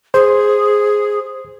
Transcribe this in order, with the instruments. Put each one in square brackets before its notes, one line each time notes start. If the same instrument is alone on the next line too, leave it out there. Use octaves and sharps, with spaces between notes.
[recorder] G#4 [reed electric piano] C5